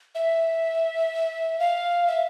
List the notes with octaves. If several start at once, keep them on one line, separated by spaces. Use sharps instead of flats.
E5
F5
E5